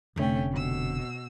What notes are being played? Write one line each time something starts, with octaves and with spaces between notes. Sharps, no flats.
F1 D3 A3 C#4 G5
B2 E6